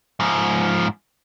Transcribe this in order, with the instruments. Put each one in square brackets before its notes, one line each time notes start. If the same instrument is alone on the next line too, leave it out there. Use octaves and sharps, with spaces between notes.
[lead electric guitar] G#2 F3